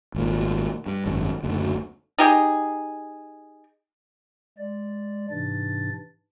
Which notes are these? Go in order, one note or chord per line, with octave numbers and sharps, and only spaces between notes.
G#1 A#2
G2
G#1 F#2
F#1 D2
D#4 G4 G#4
G#3 D5
G#2 C3 E3 D4 A6